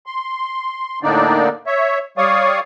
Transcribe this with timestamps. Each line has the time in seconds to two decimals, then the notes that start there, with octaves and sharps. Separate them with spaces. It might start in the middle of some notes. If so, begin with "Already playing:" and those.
0.06 C6
1.03 A2 D3 A#3 D4 D#4 D5
1.67 C#5 E5
2.18 G3 C#5 D5 F5 C#6 D#6